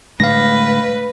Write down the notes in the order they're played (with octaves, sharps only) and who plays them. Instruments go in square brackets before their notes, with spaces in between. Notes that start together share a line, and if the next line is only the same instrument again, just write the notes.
[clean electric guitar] A2 D3 [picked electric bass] G#3 D4 [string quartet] B4 [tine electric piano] F5 A#6